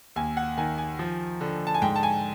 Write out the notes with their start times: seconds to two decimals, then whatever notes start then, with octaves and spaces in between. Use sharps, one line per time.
0.16 D#2 G#5
0.37 F#5
0.57 D#3 G#5
0.78 G#5
0.99 F3
1.41 D3
1.67 A5
1.74 G#5
1.82 G#2 G5
1.96 A5
2.03 G#5